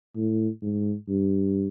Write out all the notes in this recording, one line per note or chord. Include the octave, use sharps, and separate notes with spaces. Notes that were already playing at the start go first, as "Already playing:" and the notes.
A2
G#2
G2